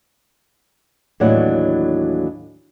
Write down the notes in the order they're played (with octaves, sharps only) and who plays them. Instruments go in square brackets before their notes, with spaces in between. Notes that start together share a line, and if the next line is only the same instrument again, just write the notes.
[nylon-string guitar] D#2 A2 E3 F#3 D4 F#5